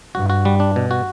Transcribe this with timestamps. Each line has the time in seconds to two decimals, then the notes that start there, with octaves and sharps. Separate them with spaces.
0.14 G2 F#4
0.30 F#4
0.45 G3
0.60 D4
0.76 B2
0.91 F#4